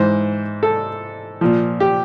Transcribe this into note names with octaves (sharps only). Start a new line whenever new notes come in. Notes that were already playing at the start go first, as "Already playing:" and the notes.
Already playing: G#2 E3 C5
A4
A#2 F3
G4